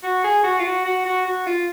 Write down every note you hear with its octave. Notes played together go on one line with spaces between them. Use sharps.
F#4
G#4
F#4
F4
F#4
F#4
F#4
F#4
F4